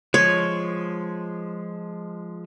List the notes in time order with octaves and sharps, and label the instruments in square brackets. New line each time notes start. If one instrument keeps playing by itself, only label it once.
[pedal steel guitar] F3 G#3 [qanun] C#5